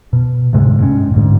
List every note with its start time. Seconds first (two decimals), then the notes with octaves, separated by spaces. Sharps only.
0.13 B2
0.53 D2 G#2 C3 G#3
0.79 G2 G#3 C4 C#4
1.12 D1 D2 G#2